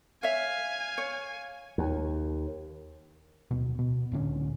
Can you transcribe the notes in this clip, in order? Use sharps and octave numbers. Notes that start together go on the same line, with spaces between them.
C#5 E5 F5 G#5
C#5
D#2
D1 B2
B2
C#2 A2 D3 C#4